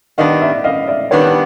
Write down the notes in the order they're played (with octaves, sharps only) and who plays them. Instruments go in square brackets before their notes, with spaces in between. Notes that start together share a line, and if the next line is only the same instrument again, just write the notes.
[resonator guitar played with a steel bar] D#3 G3 B3 D4 [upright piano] D#5 F5
[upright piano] D5 E5
D#5 F5
D5 E5
[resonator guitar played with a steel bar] D#3 G3 B3 D4 [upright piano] B4 C#5